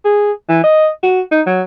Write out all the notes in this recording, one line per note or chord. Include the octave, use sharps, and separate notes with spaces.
G#4
E3
D#5
F#4
D#4
F#3